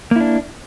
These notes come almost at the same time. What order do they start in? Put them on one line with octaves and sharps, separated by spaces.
A#3 E4 D4